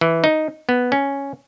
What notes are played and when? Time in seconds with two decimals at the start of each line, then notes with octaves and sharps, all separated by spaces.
0.01 E3
0.24 D#4
0.69 B3
0.92 C#4